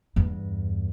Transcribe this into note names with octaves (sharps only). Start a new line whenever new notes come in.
E2 G2